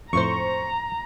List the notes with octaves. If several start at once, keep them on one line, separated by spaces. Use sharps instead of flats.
F2 A2 C5 A#5 C#6